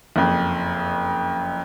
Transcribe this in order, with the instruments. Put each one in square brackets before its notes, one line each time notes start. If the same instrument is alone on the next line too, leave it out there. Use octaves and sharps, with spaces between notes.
[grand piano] F#1 F2